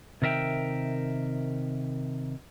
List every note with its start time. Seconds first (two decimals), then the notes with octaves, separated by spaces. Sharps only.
0.22 C3 D#3 A#4 E5 G5